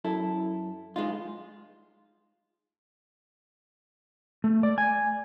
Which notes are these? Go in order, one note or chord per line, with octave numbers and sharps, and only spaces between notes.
F#2 E4 A4
G#3 D#4 F4
A3
D5
G#5